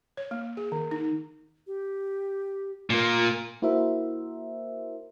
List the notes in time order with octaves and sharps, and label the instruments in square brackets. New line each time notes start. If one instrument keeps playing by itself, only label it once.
[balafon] C#5
A#3
G#4
D#3
D#4
[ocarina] G4
[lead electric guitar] A#2 A#3 [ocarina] F4
[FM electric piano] A#3 E4 F#4 A#4 C5 E5